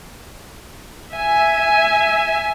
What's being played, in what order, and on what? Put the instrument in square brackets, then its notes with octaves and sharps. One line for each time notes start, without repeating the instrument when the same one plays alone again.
[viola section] E5 G#5